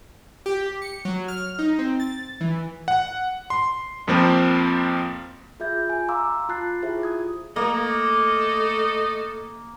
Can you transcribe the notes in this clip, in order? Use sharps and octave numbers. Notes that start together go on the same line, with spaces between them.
G4
C#7
F#3
F6
D#4
C4
A6
E3
F#5
C6
F2 F3 A#3 C4
F4 G#4 E5 G6 G#6
G#5
F5 A#5 C6 D6 E6
F4 A5 F#6 A6 C7
E4 F4 G4 G#4 C5 E5
D#6 G#6
A3 A#3 D#5